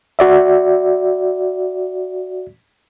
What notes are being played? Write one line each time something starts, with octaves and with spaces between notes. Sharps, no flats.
F#4 D5 E5